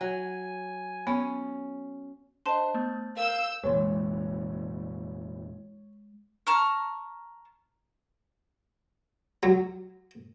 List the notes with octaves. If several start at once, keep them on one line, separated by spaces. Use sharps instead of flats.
F#3 G#5
B3 C#4
D4 C5 D#5 A5 C6
A3 B3
A#4 F5 E6 G6
F1 A#2 E3 G#3 C#5 C6
A5 A#5 C#6 F6
F#3